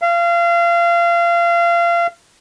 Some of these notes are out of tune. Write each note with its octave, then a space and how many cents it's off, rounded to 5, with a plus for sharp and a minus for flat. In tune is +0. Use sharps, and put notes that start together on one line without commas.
F5 -30